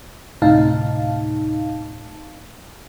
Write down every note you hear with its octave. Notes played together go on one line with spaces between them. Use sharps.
D2 A2 C3 D#4 F5 A5